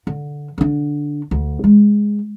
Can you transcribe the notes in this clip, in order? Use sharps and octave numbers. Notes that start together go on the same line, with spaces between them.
D3
D3 D4
D2
G#3